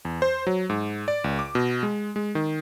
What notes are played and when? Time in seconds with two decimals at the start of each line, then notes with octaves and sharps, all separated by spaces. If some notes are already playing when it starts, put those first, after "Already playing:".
0.05 E2
0.22 C5
0.47 F#3
0.70 G#2
1.08 D5
1.24 C#2
1.39 D6
1.55 B2
1.83 G#3
2.16 G#3
2.35 D#3